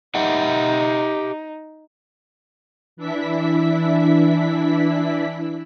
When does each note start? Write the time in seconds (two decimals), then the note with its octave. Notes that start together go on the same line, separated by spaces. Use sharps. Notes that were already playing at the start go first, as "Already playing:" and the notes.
0.15 D#4 G4 E5 F#5
2.97 E3 D4 E4 E5 B6